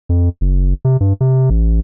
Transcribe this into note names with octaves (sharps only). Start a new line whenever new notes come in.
F2
F#1
C3
G2
C3
A1